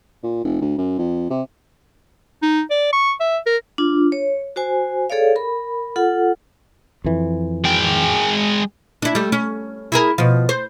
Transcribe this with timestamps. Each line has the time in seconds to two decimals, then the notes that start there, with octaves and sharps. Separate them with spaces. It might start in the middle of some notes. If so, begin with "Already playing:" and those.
0.23 A#2
0.44 F1
0.61 D2
0.78 F#2
0.99 F2
1.30 C3
2.42 D#4
2.70 D5
2.93 C#6
3.20 E5
3.46 A#4
3.78 D4 F4
4.12 C#5
4.56 F#4 C5 G#5
5.10 G#4 A4 C#5 D5 F5
5.36 A#4 B5
5.96 F4 A4 F#5
7.04 F2 E3
7.64 G#3 G5
9.02 D4 E4
9.15 G3 A3
9.32 C#4
9.92 E4 G#4 A#4
10.18 B2 F3
10.49 C5